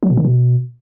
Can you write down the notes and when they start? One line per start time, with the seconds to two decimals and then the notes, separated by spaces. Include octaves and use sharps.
0.03 F#3
0.10 B2
0.17 D#3
0.25 B2